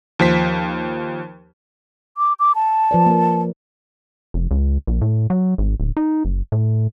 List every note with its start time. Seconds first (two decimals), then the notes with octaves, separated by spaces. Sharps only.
0.19 D#2 F3 C5 B6
2.17 D6
2.39 D6
2.55 A5
2.91 F3 B4 D5
3.06 A#3 A#4
4.34 F1
4.51 C#2
4.87 A#1
5.02 A2
5.30 F#3
5.58 G#1
5.80 D1
5.97 D#4
6.25 F#1
6.52 A2